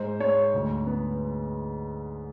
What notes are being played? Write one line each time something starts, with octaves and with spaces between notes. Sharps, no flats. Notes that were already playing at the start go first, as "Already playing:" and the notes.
Already playing: G#2 C5
G#2 C#5
D2
B3